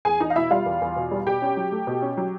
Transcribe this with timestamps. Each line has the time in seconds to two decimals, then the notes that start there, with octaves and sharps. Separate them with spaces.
0.05 E2 G#4 G#5
0.20 E2 D#4 D#5
0.30 F5
0.36 B2 E4 E5
0.51 G3 F4 F5
0.66 E2
0.81 E2
0.96 B2
1.11 G3
1.27 B2 G4 G5
1.42 C#4
1.57 F#3
1.72 A3
1.87 B2
2.02 C#4
2.17 F#3